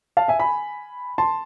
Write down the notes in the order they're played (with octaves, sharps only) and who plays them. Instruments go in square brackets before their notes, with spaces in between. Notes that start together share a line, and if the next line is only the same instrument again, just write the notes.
[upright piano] F5 A5
E5 G#5
G#5 B5
A5 C6